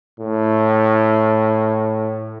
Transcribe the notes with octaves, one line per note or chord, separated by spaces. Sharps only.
A2